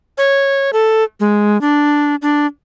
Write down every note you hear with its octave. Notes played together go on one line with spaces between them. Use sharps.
C#5
A4
G#3
D4
D4